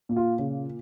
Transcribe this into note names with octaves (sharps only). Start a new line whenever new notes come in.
A#2
F4
C#3